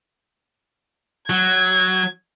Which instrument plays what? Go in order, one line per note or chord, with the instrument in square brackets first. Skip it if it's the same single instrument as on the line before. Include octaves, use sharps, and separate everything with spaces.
[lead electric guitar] F#3 [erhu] G#6